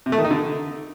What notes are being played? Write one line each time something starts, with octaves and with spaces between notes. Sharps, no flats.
C3
A3
D#3
D#4
D3